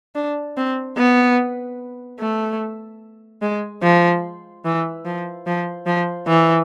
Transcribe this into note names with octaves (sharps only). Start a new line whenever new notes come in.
D4
C4
B3
A3
G#3
F3
E3
F3
F3
F3
E3